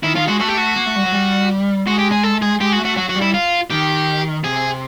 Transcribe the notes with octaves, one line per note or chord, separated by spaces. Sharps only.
D#3 E4
D#3 F4
G#3 F#4
A3 F#4
G4
F#4
A#3
A3
G3
F#3
G3
G#3 F#4
G4
G#4
A4
G#4
G#3 G4
F#4
A3
F#4
F#3 F#4
F#4
G3
E4
F4
D#3 G4
C3 G#4